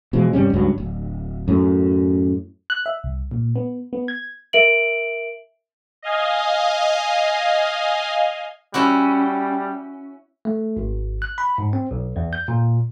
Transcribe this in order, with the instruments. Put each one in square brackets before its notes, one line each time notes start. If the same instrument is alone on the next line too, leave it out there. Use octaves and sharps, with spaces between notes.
[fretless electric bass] B2 E3 F3 G#3
G2 C3 G3 C#4
C#2 G2 F#3
D1
F#2 A2
[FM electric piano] F#6
E5
C2
A#2
B3
B3
G#6
[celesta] A#4 E5 D7 F#7
[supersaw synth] D#5 F5 G#5
[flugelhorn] G3 [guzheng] C#4 E4 F#4
[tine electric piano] A3
G#1
F#6
B5
G#2
C4
B1
E2
G6
A#2